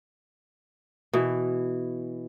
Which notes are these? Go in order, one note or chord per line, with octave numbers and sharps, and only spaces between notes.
B2 E3